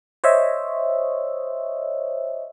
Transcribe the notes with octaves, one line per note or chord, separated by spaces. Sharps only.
C5 C#5 D#5 E5